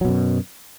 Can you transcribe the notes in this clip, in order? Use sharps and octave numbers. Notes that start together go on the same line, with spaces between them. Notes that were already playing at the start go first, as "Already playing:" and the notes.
F#2 B2 F#3